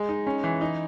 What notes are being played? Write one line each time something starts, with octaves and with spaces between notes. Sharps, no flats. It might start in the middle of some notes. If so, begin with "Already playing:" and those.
Already playing: G#3
D#4
C#4
E3
D#4